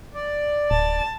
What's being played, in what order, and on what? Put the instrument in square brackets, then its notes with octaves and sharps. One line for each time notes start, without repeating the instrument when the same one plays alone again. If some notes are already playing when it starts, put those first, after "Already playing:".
[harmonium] D5
[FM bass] D1 [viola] A5